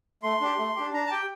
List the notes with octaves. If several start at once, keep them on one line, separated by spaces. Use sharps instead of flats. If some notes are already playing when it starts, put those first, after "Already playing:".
A3 C6
D4 G4
A3
D4 G4
D4 A#5
A5
G4 G5